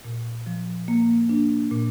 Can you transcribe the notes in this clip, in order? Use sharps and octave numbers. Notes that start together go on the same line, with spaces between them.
A#2
F3
A#3
D4
A#2